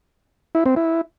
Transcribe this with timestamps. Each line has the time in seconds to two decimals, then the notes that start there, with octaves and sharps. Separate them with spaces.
0.55 E4
0.66 C4
0.76 E4